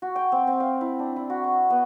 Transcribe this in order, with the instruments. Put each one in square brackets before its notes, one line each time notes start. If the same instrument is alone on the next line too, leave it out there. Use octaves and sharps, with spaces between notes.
[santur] F#4
G5
C4
C4
F5
E4
D4
E4
F#4
C#6
B3